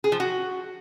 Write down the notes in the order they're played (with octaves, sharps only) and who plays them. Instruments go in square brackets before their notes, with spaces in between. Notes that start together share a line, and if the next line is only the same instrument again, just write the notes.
[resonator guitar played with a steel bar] G#4
F3
F#4